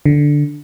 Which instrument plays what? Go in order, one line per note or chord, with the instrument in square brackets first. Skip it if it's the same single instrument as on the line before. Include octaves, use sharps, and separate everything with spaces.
[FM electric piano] D3